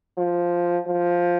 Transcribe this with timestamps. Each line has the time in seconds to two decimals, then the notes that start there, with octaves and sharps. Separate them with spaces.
0.18 F3
0.87 F3